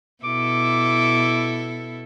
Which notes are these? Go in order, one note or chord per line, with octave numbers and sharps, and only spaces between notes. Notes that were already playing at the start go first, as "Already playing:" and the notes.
B2 E4 A4 D6